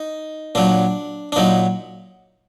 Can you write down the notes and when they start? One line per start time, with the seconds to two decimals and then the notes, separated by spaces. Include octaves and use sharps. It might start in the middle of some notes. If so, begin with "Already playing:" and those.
Already playing: D#4
0.55 A#2 F#3 D4
1.32 D4
1.36 A#2 F#3 D#4